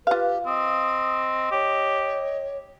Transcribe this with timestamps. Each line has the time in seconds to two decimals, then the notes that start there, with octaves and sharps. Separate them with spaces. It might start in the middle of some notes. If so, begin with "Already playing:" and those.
0.07 F4 G4 B4 F5
0.46 C4 D#5 D#6
1.51 G4 C#5